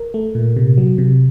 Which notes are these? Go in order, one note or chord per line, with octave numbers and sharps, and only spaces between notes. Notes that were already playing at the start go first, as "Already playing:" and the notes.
Already playing: A#4
A3
A#2
C3
F#3
C3